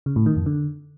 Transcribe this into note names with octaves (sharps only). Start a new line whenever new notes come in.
C#3
A2
D#3
F2
D3